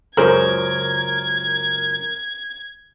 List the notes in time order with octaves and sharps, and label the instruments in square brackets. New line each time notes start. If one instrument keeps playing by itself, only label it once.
[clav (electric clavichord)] C#2 F#2 [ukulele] G#4 C5 [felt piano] A#4 [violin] G#6